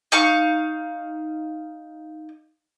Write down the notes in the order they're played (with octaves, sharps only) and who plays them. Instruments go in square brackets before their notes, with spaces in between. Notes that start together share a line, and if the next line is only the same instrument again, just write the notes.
[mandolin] D#4 F5 C#6